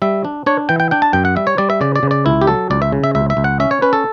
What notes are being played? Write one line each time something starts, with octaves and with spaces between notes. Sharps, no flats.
G3 E5
D4
D4 C#5
E3 G5
G5
D4 G5
A5
F#2 G5
F#5
G3 E5
C#5
G3 D5
E5
C#3 D5
D5
C#3
D5
C#2 E4
G4
F#3 A4
C#2 D5
E5
C#3
E5
C#2 E5
E5
C#2
F#5
C#4 E5
C#5
C#4 B4
A4